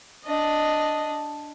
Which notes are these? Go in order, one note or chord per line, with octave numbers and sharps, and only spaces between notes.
D4 D#5